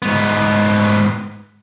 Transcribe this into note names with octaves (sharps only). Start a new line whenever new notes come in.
G#2 B3